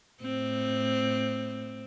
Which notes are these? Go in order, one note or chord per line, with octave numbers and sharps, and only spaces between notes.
A2 C4